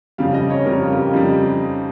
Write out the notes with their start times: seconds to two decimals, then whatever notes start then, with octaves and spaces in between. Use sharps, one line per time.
0.18 F2 C#3 G3 F5
0.34 D#5
0.50 C#5
0.66 F2 C#3 G3 A#4
0.82 F4
0.92 G4
0.99 F4
1.13 F2 C#3 G3 D#4